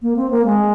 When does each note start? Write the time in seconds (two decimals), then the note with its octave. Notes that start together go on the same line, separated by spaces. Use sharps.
0.02 A#3
0.16 C4
0.31 A#3
0.45 G#3